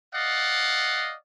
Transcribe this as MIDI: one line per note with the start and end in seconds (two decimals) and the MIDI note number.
0.14 1.14 74
0.14 1.14 75
0.14 1.14 77
0.14 1.14 78